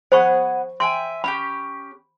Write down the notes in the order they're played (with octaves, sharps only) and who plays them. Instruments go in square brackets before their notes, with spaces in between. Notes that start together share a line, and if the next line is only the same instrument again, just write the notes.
[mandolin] B3 G#4 F#5 [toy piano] C5 B5 C#6
[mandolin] E5 G5 G#5 [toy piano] C6
[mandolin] C#4 E4 G4 [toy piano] B5